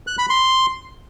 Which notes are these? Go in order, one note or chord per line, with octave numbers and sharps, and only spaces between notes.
F#6
B5
C6